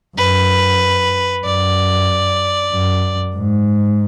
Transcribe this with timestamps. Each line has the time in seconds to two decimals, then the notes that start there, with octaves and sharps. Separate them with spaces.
0.17 F#2 B4
1.45 F#2 D5
2.73 F#2
3.35 G#2